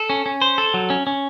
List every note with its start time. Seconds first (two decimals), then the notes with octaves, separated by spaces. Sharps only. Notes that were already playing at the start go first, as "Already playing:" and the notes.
Already playing: A4
0.10 C#4
0.26 C#4
0.42 C5
0.58 A4
0.74 F#3
0.90 C#4
1.07 C#4